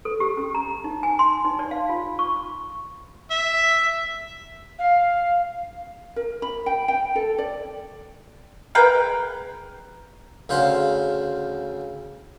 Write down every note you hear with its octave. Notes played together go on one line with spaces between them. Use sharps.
A4
G4
C#4
A#5
D#4
G#5
C6
D#4
D5
F5
F4
C#6
E5
F5
A#4
B5
G5
G5
A4
D5
G#4 A#4 B4 G5
D2 C#3 C5 F5 F#5 C6